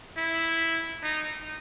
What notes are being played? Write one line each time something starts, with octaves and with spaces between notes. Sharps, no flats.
E4
D#4